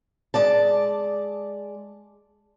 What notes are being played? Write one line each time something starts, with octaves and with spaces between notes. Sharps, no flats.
G#3 D5 A5